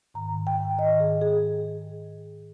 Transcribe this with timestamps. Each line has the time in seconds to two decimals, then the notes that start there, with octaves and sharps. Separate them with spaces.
0.14 G#2 D#3 A#5
0.47 G5
0.78 G#2 D#3 D#5
1.00 G#4
1.21 G#4